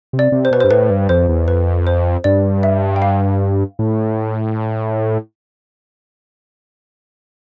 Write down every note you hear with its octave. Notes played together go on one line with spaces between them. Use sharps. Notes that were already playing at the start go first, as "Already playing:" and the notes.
C3
D5
C3
C5
B2 B4
G2 C5
A2 B4
G2
F2 C5
E2
F2 B4
C5
G2 D5
E5
G5
F5
A2